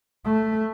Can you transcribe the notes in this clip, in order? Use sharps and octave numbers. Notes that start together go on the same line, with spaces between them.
A3